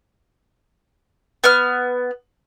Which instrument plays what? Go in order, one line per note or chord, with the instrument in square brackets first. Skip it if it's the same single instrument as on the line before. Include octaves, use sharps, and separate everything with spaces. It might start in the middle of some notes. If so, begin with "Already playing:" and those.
[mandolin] B3 F6